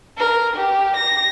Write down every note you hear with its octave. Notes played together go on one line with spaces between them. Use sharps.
A#4
G4
A#6